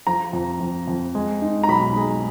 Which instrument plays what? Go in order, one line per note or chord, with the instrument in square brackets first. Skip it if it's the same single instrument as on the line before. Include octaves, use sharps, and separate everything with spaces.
[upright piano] F3 A#5
F2
F2
F2
G#3
D#4
A#5
B1 B5
G#3